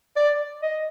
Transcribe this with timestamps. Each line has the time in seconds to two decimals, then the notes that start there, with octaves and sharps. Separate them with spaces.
0.16 D5
0.63 D#5